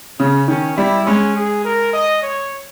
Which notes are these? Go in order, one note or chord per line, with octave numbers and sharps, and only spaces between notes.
C#3 C#4
D#3 C#4
G3 E4
G#3 C#4
G#4
A#4
D#5
C#5